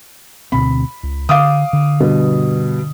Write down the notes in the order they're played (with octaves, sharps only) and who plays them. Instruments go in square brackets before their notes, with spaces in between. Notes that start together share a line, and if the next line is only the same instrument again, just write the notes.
[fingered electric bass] D2 B2 C4 [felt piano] B5
[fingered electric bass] C#2
[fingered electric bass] D3 [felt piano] F5 D6 D#6
[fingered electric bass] D3
[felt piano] G2 B2